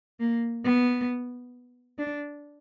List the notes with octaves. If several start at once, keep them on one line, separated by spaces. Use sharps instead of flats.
A#3
B3
D4